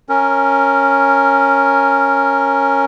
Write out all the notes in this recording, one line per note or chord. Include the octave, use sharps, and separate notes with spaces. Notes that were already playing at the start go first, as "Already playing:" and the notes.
C#4 A#4